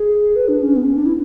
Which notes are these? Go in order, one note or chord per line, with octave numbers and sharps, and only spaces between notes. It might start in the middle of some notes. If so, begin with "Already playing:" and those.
Already playing: G#4
B4
D4
C#4
B3
C#4
D4
E4